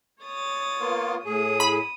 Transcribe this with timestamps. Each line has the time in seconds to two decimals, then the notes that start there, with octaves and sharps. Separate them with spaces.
0.23 C#5 D#6 A6
0.79 A#3 B3 F4
1.25 A2 G#4 D#6
1.60 B5